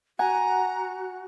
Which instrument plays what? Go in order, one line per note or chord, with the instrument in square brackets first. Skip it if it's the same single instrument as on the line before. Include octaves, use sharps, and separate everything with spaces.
[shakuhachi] F#4 [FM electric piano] F#5 [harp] G#5 [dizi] A#5